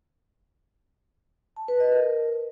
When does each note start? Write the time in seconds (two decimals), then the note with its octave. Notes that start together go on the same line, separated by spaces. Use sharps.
1.56 A5
1.68 B4
1.80 D#5
1.92 A#4